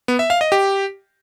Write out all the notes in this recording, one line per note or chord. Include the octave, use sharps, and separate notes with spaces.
B3
E5
F5
D#5
G4